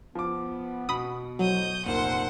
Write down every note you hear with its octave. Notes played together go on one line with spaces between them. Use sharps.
F3 B3 D6
B2 B5 D#6
A2 F#3 C5 D#5 D#6 G6
F1 A#2 A#4 C5 F#5